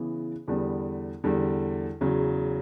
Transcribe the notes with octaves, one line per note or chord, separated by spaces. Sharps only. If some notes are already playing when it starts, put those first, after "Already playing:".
Already playing: C#3 E3 B3
E2 D3 G3 B3
E2 D3 G3
E2 C#3 F#3